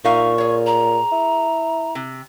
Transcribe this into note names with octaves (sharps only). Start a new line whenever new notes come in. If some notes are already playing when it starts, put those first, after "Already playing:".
A#2 D#4 E5 F5 C#6
G#4 C#5
A#5
E4
C3